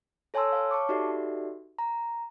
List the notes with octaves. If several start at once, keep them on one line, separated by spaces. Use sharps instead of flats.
A4 C#5 G#5 A5 C6 E6
C#5 F5
A5 C#6 D6
D#4 F#4 G4 A4 D5 E5
A#5